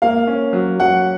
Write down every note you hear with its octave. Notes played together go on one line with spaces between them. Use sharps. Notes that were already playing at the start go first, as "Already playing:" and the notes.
A#3 F5
C#4
F#3
F#3 F#5